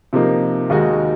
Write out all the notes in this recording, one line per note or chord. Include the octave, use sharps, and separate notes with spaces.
C3 F3 A#3 D#4
D#2 D#3 G#3 D#4 F#4